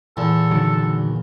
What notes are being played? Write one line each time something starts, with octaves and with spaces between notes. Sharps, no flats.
E2 A#2 A4
D3 D#3 F#3